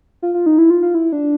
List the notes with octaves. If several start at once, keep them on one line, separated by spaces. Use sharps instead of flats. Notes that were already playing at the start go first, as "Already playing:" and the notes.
F4
F4
D#4
E4
F4
F4
E4
D4